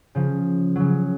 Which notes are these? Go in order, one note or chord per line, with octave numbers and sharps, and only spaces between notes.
C#3 F3
C#3 F#3